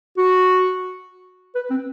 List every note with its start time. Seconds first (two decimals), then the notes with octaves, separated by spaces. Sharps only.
0.18 F#4
1.55 B4
1.71 C4